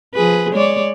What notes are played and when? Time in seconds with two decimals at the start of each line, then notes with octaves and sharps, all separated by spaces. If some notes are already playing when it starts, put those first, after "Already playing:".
0.14 F3 G#4 B4
0.53 G#3 C#5 D5